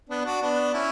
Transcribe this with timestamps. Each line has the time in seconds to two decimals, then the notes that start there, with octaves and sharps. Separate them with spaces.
0.09 B3 D4
0.25 D4 F#4
0.42 B3 D4
0.74 C#4 E4